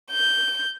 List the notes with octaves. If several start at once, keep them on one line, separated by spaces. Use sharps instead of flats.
G6